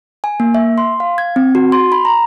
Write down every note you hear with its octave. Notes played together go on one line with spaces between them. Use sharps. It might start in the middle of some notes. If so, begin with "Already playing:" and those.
G#5
A#3
E5
C6
F5
G#6
C4
F#4
C6
B5
A#5